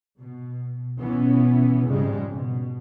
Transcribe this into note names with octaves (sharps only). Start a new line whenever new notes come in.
B2
B2 E3 B3 C#4
F2 G#2 C#3 G3 G#3
B2